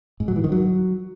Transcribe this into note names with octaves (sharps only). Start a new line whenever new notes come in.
G#2
F#3
E3
D#3
F#3